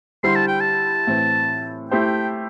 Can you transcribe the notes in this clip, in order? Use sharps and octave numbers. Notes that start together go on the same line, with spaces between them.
D3 G3 E4 C5 C6
A5
G5
A5
A2 E3 C4
A3 E4 G4 C5 G5